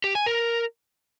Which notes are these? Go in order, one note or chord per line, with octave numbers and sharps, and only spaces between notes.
G4
G#5
A#4